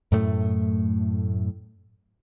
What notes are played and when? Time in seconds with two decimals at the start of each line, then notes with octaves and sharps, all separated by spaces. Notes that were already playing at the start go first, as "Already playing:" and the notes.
0.12 F#2 A2 A3